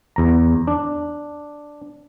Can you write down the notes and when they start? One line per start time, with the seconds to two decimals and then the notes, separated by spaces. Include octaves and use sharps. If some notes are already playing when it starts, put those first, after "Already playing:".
0.16 E2 A#5
0.67 D4